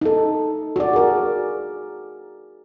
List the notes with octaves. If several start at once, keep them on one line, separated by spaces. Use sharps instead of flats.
D#4 A4
F#4 D5
G#4 A#4